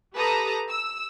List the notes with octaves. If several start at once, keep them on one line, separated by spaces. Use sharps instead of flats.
G4 A4 B4 A5 A#5 D#6
E6